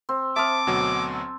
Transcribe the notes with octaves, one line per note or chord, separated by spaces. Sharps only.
C4
C4 E5 A5 D6 D#6 F6
D2 B2 F#3